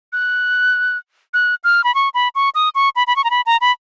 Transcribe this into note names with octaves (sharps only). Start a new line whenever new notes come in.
F#6
F#6
F6
B5
C#6
B5
C#6
D#6
C#6
B5
B5
C#6
A#5
B5
A#5
B5